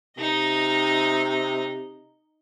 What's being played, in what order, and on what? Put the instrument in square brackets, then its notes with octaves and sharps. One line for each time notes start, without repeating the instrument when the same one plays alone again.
[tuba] C3 [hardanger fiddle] D#4 D#5